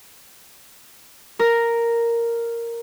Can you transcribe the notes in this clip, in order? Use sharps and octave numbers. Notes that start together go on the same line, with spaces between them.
A#4